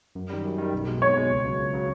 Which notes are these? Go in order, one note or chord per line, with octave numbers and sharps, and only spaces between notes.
F#2
D#3 G3
F#2
D#3 G3
B1
B2 G#3
B1 C#5
B2 G#3
C#2
C#3 F#3
C#2
C#3 F#3